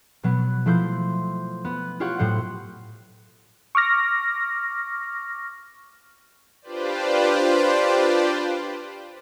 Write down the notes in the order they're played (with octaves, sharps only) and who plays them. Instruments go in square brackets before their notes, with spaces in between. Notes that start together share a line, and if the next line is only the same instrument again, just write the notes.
[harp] B2 F#3 B3
F3 A3 E4 C5 C6 G6
B3
E4 F4 G4 C#5 F#5
A2 F#3 C5 F#5 C#7
[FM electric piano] C#6 D6 F6 A#6
[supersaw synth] D4 F4 G4 B4 C5 D5